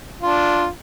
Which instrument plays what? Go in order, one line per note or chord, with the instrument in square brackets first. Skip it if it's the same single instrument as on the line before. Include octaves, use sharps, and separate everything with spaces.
[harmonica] D4 F4